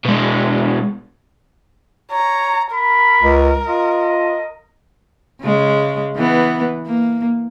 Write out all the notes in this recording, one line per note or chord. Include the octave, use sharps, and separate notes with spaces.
B2 G#3
C#5 A#5
A#4 B5
C#2
F4 D#5
C#3 G#3
E3 B3
A#3